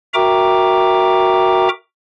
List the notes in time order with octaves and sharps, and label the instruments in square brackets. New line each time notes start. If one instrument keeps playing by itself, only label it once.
[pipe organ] F#4 A#4 E5 G5 A#5 D6